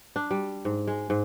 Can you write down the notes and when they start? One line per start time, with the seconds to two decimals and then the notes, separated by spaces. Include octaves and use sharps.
0.16 D4
0.31 G3
0.65 G#2
0.87 G#3
1.10 G#2